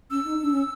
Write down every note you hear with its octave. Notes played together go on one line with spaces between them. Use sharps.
C#4 E6
D#4
D4
C#4